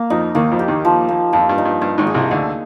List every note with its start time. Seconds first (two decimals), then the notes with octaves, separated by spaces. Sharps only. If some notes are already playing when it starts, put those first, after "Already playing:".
Already playing: A#3
0.10 F2 F3 D#4
0.35 D#2 D#3 A#3
0.51 F2 F3
0.59 G4
0.68 D#2 D#3
0.85 F3
1.09 A#3
1.33 F2 F3
1.49 G2
1.58 D#4
1.65 G2
1.81 G2 F5
1.98 G#1 G#2
2.07 G#4
2.14 C2 C3
2.31 D2 D3 D#4